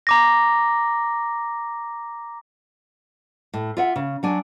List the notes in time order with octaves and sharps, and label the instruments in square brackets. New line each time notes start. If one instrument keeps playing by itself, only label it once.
[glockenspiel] A#5 D6 A#6
[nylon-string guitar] A2
F4 E5 F#5
C#3
F#3 D4 G#5